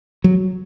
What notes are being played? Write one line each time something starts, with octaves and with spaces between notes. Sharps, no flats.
F#3